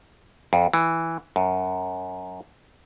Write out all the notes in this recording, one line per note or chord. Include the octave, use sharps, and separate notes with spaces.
F2
E3
F#2